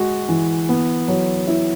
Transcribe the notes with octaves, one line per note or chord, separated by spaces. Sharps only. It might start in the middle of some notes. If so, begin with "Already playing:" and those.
Already playing: G#3 F#4
E3
B3
F#3
E4